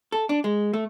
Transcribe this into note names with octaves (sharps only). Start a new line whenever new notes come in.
A4
D4
G#3
A3